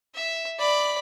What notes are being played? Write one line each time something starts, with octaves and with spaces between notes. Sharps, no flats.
E5
D5 B5